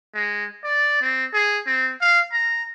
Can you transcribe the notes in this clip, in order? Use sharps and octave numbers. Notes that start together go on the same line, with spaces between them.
G#3
D5
C4
G#4
C4
F5
A#5